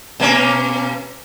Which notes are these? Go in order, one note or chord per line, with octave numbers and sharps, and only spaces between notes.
B2 A#3 C#4